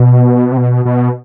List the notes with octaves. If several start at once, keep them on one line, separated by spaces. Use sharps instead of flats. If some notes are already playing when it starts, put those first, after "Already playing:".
Already playing: B2
C3
B2
B2